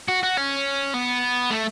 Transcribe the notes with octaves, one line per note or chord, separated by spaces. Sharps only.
F#4
F#4
C#4
B3
A3